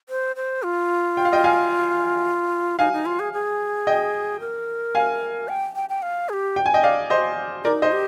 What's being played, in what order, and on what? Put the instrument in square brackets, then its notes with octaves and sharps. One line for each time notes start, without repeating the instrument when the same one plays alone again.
[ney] C5
C5
F4
[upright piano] G5
F5
D#5 G5
F5 G#5
[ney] D#4 [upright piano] F5 G#5
[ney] D#4
F4
G#4
G#4
[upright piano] D#5 G5
[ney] A#4
[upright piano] F5 G#5
[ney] G5
G5
G5
F5
G#4
G4
[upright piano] G5
G#5
D#5 G5
D5 F5
C5 D#5
[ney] F4 [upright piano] A#4 D5
[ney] D#4
[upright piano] C5 D#5
[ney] G4